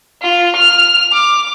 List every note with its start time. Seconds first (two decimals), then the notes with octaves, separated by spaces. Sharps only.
0.22 F4
0.56 F6
1.13 D6